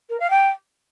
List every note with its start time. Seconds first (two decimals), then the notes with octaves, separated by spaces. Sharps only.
0.09 A#4
0.20 F5
0.30 G5